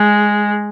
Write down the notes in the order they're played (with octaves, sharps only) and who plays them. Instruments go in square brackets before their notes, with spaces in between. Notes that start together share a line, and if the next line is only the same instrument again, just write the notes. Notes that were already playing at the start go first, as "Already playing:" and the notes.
Already playing: [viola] G#3